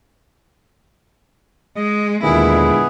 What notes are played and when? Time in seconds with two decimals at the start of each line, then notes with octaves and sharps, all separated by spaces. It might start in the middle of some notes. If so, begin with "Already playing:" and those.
1.76 G#3 D#5
2.23 D#2 A#2 D3 G#3 B3 E4 G#4